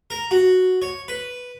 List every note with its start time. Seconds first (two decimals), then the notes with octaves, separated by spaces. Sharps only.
0.10 A#4
0.31 F#4
0.82 C#5
1.08 B4